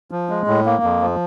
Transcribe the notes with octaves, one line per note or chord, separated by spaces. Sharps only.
F3
G#3
A2
A#3
F2
F3